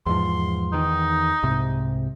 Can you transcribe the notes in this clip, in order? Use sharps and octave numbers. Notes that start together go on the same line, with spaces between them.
E2 G#2 F3 C6
E2 D#3 D#4
C2 G#2 C3